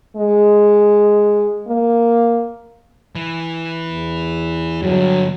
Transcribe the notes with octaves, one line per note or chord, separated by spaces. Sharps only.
G#3
A#3
E3
E2
G2 D3 F#3